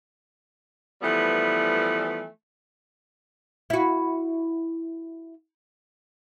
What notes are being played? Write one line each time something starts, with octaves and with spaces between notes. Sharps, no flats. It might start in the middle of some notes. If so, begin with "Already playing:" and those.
E3 F3 G3 A3 B3
E4 F#4